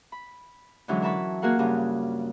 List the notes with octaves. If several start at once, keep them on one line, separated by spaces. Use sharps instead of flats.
B5
D3 E3 F#3 G#3 C#4
A#4 E5 A5 B5 C#6
A#3 F#4 G#4 A#4 F5 F#5
G2 C#3 F4 F#4 G#4